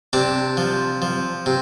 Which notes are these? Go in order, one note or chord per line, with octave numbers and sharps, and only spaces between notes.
C3 D4
F3
F3
C3